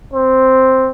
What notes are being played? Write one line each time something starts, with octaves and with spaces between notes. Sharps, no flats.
C4